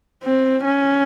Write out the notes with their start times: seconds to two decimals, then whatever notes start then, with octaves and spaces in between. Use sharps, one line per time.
0.24 C4
0.65 C#4